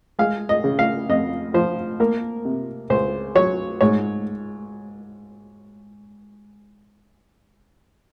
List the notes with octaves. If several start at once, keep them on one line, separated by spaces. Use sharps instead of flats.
G#3 F5
D#5
C#3
F5
F2 D#5
F3 C5
A#3 A#4
C3
C#2 C5
F#3 C#5
G#2 C#5